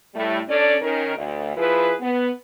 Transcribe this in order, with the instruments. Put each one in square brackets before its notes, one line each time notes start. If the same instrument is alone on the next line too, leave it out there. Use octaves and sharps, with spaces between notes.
[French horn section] A2 G3 A3
C#4 D4 A4 D5
D#3 C#4 A#4
D2
F3 E4 G#4 B4
B3